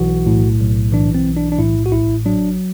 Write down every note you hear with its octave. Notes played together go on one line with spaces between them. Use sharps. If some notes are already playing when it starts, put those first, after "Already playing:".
Already playing: B1 E3 F#4
A2
B1
E3 D4
C4
B1
D4
D4
A2 E4
F#4
A1 E4
F#3 D4